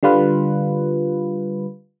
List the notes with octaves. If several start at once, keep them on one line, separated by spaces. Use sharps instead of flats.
D3 G3 F4 B4